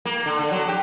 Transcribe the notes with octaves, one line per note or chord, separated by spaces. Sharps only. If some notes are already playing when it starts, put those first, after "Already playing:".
A#3
D3
D3
F#3
G4